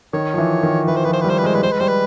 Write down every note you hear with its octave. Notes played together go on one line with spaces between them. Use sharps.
D#3 C#5
F3
E3
D#3
E3 B4
C5
F3 B4
C5
B4
G3 C5
B4
G#3 C5
G3 B4
G#3 C5
B4
G3 C5
B4